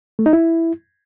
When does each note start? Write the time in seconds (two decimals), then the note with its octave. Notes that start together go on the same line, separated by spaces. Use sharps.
0.19 A3
0.26 D#4
0.33 E4